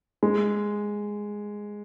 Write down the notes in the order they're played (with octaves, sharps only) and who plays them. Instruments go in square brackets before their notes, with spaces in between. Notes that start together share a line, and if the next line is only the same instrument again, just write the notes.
[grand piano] G#3